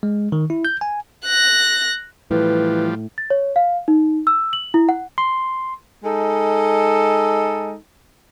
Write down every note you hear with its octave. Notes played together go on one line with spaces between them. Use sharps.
G#3
D#3
E4
G6
G#5
F#6 A#6
A2 E3 F3 G3 B4
A6
C#5
F5
D#4
E6
F#7
E4
F#5
C6
G#3 D#4 A4